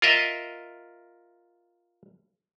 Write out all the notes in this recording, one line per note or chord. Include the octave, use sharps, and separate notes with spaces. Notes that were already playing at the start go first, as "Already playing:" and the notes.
F4 A#4 D#5 E5